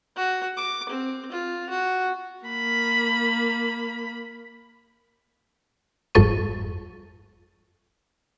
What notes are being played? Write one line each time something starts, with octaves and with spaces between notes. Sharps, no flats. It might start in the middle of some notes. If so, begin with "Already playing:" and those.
F#4
D6
C4
F4
F#4
A#3 B5
G1 F2 G#2 A4 C#6 D#7